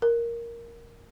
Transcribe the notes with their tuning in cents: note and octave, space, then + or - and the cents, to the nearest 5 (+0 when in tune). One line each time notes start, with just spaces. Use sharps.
A#4 +5